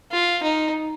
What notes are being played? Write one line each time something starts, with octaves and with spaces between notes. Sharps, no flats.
F4
D#4